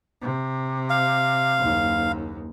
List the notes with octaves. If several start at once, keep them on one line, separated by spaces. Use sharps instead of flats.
C3
F5
F#1 D#2